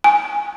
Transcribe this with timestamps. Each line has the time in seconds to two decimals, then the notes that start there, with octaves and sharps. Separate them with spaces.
0.04 G#5